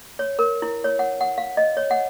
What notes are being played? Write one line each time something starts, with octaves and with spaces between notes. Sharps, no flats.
C#5
A#4
E4
C#5
F#5
F#5
F5
D#5
C#5
F#5